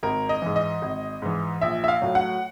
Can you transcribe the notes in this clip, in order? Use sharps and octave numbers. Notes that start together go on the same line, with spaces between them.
G#1 A#4
D#5
G#2 E3
D#5
G#1
G#2 E3
A#1 E5
E5
F5
A2 F#3 A3
F#5